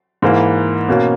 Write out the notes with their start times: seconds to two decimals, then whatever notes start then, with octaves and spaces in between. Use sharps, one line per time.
0.22 G#2 E3 A#3 E4
0.88 B2 A#3 C#4